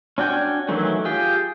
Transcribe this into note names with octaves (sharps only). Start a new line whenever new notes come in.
C#4 D4 F#4 G5 G#5
D#3 E3 F#3 A3 C#4
F4 G4 G#4 G5